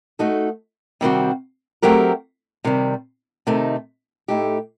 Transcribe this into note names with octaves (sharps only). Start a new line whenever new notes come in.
A3 D#4 F#4 A4
C3 D#3 G3 C4 F#4
F#3 A3 C4 G4 A#4
C3 D#3 G3
C3 D#3 A3 D#4
A2 A3 D#4 G4